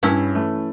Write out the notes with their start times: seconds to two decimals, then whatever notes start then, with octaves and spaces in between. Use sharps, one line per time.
0.03 G2 C#4 E4
0.35 E3 A3